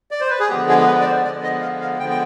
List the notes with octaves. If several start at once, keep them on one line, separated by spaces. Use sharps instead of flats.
D5
C5
B4
G#4
D3 F3 G#3 B3 G4
G#4
B4
D5
C5
D3 F3 G#3 B3 D5
D#5
F5
F5
D3 F3 G#3 B3 G5
G5